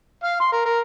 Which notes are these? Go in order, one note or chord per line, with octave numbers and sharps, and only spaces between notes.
F5
C6
A#4
A#4